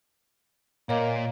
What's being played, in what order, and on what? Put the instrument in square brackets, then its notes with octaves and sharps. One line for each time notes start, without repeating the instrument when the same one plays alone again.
[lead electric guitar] A#2 [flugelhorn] A#3 [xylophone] C#5 D#5